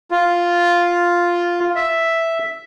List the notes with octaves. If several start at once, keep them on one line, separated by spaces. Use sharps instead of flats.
F4
E5